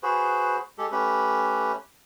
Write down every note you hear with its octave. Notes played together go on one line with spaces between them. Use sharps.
F#4 G#4 B4 C5
G#3 G4 A4
A3 C#4 G4 B4